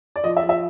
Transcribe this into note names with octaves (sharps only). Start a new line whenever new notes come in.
D5
F3 D#5
E5
F3
E5